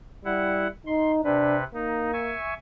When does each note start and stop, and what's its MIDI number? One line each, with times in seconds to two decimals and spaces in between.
0.25 0.67 55
0.25 0.67 64
0.25 0.67 78
0.87 1.22 63
0.87 1.12 84
1.24 1.64 48
1.24 1.56 62
1.24 1.64 71
1.74 2.35 58
1.74 2.11 63
2.13 2.54 76
2.13 2.54 80
2.13 2.54 85